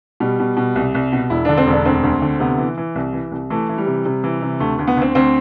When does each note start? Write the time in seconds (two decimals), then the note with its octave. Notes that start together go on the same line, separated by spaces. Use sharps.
0.20 B2 G3
0.39 B2
0.57 B2
0.76 C2
0.95 C2
1.12 B2
1.30 E1 E4
1.45 D3 D4
1.57 C4
1.67 E1
1.72 D4
1.85 D2 C4
2.03 D2
2.22 D3
2.40 C3 B3
2.58 E3
2.77 E3
2.95 C2
3.13 E3
3.32 C2
3.50 E3 A3
3.69 E3
3.78 G3
3.87 C3
4.06 C3
4.24 E3
4.42 C3
4.60 D2 A3
4.79 D2
4.87 B3
4.97 D2 C4
5.15 D2 C4